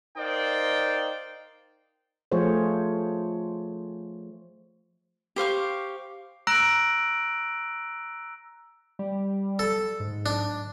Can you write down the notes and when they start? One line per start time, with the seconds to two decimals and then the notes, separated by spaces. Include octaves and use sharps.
0.17 D#4 A#4 C5 D5 F5 G5
2.32 F3 A3 F4 G#4 C5 C#5
5.36 G4 C5 F5 C#6
6.47 A#5 E6 F#6 A#6 D7 F#7
8.99 G3
9.59 A4
10.00 G#2
10.26 D4